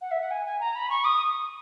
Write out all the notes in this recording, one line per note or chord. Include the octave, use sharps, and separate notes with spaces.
F#5
E5
F#5
G#5
G#5
A#5
B5
C#6
D#6